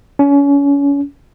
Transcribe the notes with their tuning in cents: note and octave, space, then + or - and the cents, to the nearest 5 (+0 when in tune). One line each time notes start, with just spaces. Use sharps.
C#4 +30